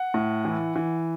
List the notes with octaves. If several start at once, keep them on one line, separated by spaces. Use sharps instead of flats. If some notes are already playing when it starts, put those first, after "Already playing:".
Already playing: F#5
A2
E3
E3